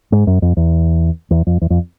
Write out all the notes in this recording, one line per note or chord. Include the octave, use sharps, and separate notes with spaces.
G#2
F#2
F2
E2
E2
F2
E2
F2